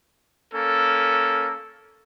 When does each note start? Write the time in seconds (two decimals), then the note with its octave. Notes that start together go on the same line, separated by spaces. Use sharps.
0.54 A#3 C#4 A4